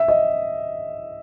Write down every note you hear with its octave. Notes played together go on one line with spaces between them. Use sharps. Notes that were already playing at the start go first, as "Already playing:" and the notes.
Already playing: E5
D#5